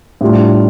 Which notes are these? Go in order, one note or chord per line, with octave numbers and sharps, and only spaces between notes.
A2 G3 D4 F4